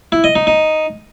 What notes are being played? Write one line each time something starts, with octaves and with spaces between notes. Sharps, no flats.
E4
D#5
D#4
D#4